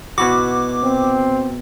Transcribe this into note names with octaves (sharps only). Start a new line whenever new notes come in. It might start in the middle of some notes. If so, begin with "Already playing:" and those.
B2 E4 F#4 D6
C4